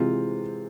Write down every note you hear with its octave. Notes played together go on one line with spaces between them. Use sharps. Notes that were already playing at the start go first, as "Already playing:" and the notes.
Already playing: C3 E3 G#3 C4 F4